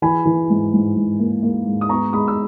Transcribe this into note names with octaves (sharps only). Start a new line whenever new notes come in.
E3 G#5 B5
E3
G#2
G#2
G#2
A#3
A#3
G#2
D#6
B3 A#5 C#6
G#3 B5 D#6
E6